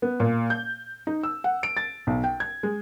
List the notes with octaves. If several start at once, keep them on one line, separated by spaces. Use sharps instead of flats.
B3
A#2
G6
D#4
E6
F#5
D7
A6
B1
G5
G#6
G#3